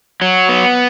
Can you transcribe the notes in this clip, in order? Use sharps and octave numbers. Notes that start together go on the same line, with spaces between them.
F#3
B3